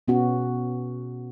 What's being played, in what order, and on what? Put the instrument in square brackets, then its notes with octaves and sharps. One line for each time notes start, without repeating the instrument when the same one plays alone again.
[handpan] B2 B3 C#4 F#4